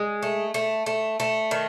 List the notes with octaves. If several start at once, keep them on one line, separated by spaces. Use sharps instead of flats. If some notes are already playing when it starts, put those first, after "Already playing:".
Already playing: G#3
A3
A3
A3
A3
D#3